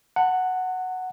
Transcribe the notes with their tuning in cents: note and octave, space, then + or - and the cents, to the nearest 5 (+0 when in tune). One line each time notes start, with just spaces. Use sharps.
F#5 +0 A5 +40